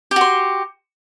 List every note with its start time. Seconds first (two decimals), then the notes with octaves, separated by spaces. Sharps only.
0.11 G4
0.16 F#4
0.21 C6